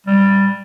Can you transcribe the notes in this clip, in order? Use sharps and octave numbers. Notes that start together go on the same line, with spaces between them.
G3